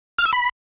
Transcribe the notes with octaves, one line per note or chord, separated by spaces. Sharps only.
F6
E6
B5